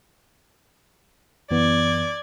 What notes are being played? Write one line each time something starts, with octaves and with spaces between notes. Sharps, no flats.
F#2 E3 B3 D5 G#6